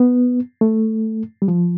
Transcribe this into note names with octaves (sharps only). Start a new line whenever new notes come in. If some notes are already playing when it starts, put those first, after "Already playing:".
Already playing: B3
A3
G3
F3